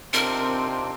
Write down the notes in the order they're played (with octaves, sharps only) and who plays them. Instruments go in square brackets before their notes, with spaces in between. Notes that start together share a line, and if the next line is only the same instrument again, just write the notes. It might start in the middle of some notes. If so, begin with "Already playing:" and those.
[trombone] C3 [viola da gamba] C4 [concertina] D4 D#4 F4 [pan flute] A#4